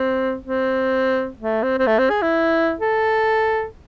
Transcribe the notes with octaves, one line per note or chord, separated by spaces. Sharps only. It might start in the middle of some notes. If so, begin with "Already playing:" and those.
Already playing: C4
C4
A3
C4
C4
A3
C4
G#4
E4
A4